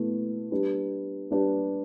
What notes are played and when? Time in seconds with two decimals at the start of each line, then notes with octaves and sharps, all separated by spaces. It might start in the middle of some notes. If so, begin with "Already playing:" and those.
Already playing: B2 A3 E4 B4
0.51 G3 D4 G4 B4
1.31 G3 D4 G4 B4